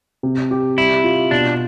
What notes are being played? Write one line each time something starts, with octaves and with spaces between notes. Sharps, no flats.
C3
G4
G3 E4
F4
B2 D4